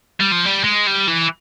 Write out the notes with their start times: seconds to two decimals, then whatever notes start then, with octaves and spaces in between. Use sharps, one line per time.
0.20 G3
0.32 F3
0.45 G3
0.64 G#3
0.86 G3
1.08 E3